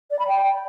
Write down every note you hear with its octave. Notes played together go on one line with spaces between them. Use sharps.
D5
B5
G5